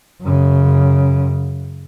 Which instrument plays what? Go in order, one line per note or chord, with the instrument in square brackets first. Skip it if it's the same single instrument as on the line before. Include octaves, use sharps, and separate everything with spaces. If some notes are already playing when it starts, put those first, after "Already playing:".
[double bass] F#2 C#3